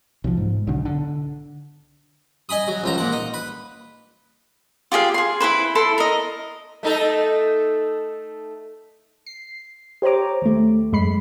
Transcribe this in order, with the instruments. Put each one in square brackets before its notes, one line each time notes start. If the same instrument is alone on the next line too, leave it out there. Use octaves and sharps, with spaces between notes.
[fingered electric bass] B1 F3
G#2
B1 D3
D3
[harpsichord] D#5 G#5 B5 D#6
F#3
C#2 F3 A#5
A#2 F#5
D#4
B4
[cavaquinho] F4 G4 G#4 F5
G#4 C6
E4 G#4 B4 C5
E4 A4 C6
A#4 D#5
[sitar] A3 D#4 A4
[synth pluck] C7
G4 C5 C#5 A#5 D6
D#2 A3
F#2 G#3 B5 C7